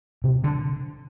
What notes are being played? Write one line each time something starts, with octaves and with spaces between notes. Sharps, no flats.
C3
D3